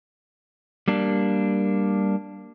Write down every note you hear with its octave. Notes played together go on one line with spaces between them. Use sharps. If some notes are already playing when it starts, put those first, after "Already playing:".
G3 A#3 D4